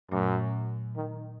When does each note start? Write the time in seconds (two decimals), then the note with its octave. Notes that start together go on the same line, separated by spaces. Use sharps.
0.11 F#2 A#2 F#3 A3
0.96 D#3